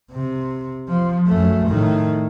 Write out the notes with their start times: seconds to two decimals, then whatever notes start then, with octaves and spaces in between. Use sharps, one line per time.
0.11 C3
0.88 F3
1.27 F#2 A3
1.68 A2 D#3